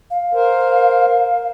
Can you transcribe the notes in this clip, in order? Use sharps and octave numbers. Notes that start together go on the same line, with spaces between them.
F5
A#4 C5